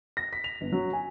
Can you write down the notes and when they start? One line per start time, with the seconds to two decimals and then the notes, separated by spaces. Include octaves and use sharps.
0.17 A#6
0.33 B6
0.44 F7
0.61 G1
0.73 F#3
0.93 G#5